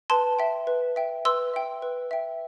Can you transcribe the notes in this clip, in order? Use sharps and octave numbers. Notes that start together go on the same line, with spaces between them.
B4 A5 C6
E5 G5
B4
E5 G5
B4 C6 E6
E5 G5
B4
E5 G5